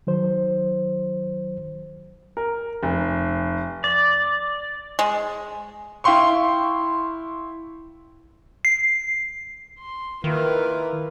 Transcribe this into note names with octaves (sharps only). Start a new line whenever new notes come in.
D#3 F#3 C5
A#4
F1
D5
G#3
E4 F5 G5 C6 C#6
C7
C6
D#3 A#3 E4 F4 A#4 B4